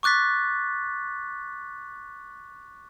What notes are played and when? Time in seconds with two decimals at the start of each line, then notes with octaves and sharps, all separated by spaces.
0.03 C#6 D6 F#6 A6 B6